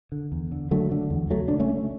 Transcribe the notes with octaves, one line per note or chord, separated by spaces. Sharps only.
D3
E2
D3
D3 F#3 A3
D3
E2
C#2 F#3 A3
C#3 D4
A3 C#4
C#3